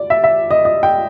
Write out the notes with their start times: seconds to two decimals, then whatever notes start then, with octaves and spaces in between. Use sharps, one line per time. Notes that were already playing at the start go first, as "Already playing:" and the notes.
Already playing: D5
0.10 E5
0.24 E5
0.51 D#5
0.65 D#5
0.83 G5